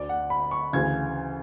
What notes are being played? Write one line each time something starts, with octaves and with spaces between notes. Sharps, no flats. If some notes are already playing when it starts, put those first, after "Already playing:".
Already playing: D2 D3 D5
F#5
B5
C#6
D2 C#3 E3 G#6